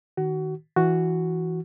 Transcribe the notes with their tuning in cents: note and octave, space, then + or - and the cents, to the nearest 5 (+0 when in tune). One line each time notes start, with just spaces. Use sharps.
D#3 +0 F#4 +25
E3 +0 F#4 +0